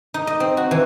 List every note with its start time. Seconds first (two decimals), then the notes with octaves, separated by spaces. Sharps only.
0.14 D#4
0.27 D#5
0.40 C4
0.57 F#4
0.71 E3